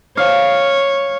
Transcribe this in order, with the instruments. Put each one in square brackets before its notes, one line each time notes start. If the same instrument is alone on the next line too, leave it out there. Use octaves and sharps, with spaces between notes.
[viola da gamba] C#5 [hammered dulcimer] F5